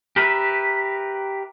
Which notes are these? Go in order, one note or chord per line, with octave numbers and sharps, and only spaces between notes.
G4 A#4 B4 E5